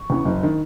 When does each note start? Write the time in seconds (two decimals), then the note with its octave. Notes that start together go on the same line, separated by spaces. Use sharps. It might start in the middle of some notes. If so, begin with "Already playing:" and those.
Already playing: C#6
0.10 E2 C#3 E3
0.25 F#1
0.43 D#3